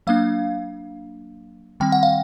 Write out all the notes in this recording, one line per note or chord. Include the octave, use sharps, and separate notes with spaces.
F#3 A#3 D4 F5
D#3 G3 C4 G5
F#5
F5